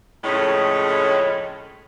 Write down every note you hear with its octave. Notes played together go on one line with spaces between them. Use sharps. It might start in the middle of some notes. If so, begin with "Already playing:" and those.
F2 A2 C#3 G#3 A3 C#4